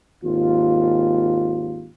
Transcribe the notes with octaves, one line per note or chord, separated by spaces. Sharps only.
G#1 D#2 F4